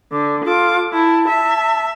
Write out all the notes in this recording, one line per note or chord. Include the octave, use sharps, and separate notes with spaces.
D3 D6
F4 A4 D6
E4 A5
E5